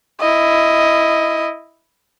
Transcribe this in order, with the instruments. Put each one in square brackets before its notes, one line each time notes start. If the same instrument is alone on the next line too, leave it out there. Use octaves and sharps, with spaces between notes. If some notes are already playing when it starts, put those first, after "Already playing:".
[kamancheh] E4 D#5